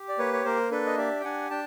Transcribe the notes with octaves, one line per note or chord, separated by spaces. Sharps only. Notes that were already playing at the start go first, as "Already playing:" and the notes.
Already playing: G4
D5
A#3 B4 C#5
C#5
A#3 A#4 C5
D4 A4 B4
D#5
G4 D5 E5
G5
D4 F#5 G#5
D4 G5 A5